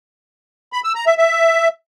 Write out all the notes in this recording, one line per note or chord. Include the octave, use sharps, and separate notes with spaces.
B5
E6
A#5
E5
E5